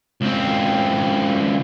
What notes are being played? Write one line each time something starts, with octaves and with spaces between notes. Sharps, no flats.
C#2 C4